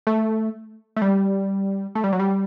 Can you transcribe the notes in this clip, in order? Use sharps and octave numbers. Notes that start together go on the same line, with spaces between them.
A3
A3
G3
A3
G3
F#3
G3